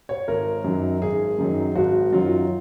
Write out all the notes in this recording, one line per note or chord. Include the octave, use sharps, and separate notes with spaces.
C#5
G#1 A#4
F#2 D#3 F#3
G#1 G#4
F#2 D#3 F#3
G#1 F#4
F#2 D#3 F#3 F4